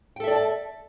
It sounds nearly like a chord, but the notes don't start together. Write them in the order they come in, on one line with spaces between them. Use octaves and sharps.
G5 A4 E5 D5 A5